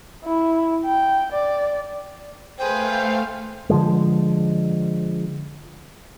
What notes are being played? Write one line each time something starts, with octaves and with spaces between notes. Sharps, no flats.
E4
G5
D5
A3 G#4 B4 C5 F5 G5
D3 F3 G#3